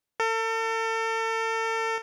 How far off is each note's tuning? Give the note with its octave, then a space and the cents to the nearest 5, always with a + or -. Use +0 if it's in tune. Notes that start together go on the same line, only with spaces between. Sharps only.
A4 +40